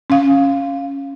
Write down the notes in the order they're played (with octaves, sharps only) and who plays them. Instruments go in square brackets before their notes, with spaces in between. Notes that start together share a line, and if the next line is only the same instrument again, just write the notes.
[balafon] C#4 F5